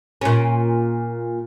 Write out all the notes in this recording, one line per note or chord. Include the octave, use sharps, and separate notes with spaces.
A#2 C#4